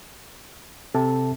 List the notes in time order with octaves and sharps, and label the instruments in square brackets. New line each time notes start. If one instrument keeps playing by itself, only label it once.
[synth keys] C3 [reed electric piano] A4 A5